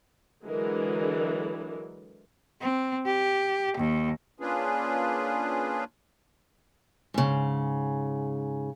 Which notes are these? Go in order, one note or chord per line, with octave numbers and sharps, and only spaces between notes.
D3 E3 F#3 G#3 A#4
C4
G4
D#2
A#3 C#4 D4 F4 G#4 B4
G#2 C#3